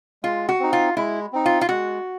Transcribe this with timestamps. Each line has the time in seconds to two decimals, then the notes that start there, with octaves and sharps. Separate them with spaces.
0.23 G#3 F4
0.49 F#4
0.60 C4 D#4
0.73 F4
0.97 G#3 E4
1.33 C4 D#4
1.46 F4
1.61 F4
1.69 G#3 F#4